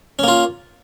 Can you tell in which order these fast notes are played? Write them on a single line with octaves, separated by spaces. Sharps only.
C#4 A#3 F4